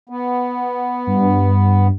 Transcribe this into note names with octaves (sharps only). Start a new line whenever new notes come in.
B3
G2